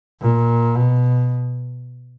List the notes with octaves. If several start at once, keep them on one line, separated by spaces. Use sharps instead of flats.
A#2
B2